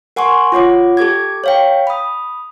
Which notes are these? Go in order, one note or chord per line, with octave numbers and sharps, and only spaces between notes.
A#4 F#5 G#5 C6 C#6
F4 C#5 F#5 D6
G4 A4 D6 G#6
C#5 F5 G5
B5 D#6